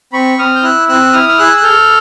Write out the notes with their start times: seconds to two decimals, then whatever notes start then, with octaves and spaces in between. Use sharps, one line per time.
0.13 C4 B5 C#6
0.38 C4 D#6 F6
0.55 G6
0.63 E4 E6 F#6
0.89 C4 E6 F#6
1.13 E4 D#6 F6
1.29 F6
1.38 G#4 E6 F#6
1.57 F#6
1.63 A4 F6 G6